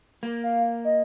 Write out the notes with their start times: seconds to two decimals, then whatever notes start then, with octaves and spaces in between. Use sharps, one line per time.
0.23 A#3
0.44 F5
0.85 D#5